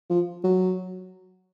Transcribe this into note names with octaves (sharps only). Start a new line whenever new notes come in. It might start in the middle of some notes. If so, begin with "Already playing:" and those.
F3
F#3